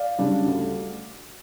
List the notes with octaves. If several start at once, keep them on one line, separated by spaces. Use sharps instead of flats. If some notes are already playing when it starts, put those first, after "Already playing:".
Already playing: D5 F5
C#3 G3 D4
D2